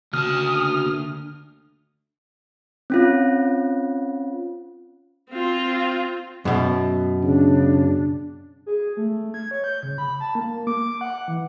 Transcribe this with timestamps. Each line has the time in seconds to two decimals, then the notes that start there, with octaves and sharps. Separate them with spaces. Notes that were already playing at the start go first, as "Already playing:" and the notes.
0.13 D2 C#3 A#3 F#4 A5 D#6 F6
2.90 C4 C#4 F4
5.30 C4 F4
6.45 F#2 B2
7.23 C#3 D4
8.66 G#4
8.97 A3
9.34 G#6
9.51 C#5
9.64 G6
9.83 C#3
9.98 B5
10.20 A5
10.35 A#3
10.67 D6
11.01 F#5
11.28 E3